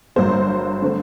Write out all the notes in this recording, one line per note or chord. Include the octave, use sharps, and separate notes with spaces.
G1 G2 F#3 A#3 C5
D3 A3 C4